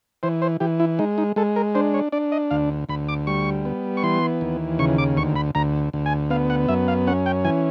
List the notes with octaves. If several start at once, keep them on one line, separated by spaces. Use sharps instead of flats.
E3 C5
C5
E3 G4
E4
G#3 D#4
D#4
G#3 A4
A#4
D4 C5
C#5
D4 D5
D#5
D2 F5
D2 B5
D6
G3 C#6
B3
C#6
E3 C6
D#2
C#3 C#6
D6
D2 C#6
B5
D2 A#5
D2
G#5
B3 F5
F#5
F#2 E5
F5
C#4 F#5
G5
E3 G#5